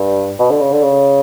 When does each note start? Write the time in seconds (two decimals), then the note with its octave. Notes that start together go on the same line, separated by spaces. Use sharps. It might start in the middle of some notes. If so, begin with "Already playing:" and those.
Already playing: G2
0.39 B2
0.51 D3
0.60 C#3
0.72 D3
0.82 C#3